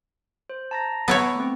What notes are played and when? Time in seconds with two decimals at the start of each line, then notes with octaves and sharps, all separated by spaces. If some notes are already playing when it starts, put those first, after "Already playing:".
0.50 C5
0.71 A5 A#5 A#6
1.08 B3 E4 C#5
1.36 A3 C4